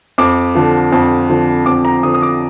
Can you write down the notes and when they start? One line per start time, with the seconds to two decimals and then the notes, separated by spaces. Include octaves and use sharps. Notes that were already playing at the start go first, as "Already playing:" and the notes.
0.18 F2 D6
0.55 D3 F3
0.92 F2
1.29 D3 F3
1.66 F2 D6
1.85 A#5
2.03 D3 D#6
2.06 F3
2.14 D#6
2.22 D6